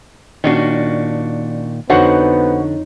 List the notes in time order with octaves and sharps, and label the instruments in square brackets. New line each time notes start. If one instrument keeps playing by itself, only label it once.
[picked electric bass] A#2 D#3 [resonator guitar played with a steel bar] C#4 D4 F#4
[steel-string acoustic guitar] F2 D#4 C#5 [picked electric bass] D3 [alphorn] B3 [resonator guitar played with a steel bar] F#4 C5 F#5